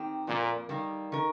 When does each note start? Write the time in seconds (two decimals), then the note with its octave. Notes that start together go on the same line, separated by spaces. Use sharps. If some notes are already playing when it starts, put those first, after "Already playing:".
Already playing: D#3 C4 G4
0.27 F2 A#2 F3 A#3 F4 A#4
0.69 D#3 G3 A#3
1.12 D#3 A#4